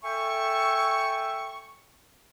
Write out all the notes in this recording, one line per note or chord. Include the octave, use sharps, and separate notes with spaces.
A4 E5 G5 G#5 C#6